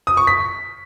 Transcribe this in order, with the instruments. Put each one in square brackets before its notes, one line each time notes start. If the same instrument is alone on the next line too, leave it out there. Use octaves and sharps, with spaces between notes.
[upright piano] D#6
C#6
B6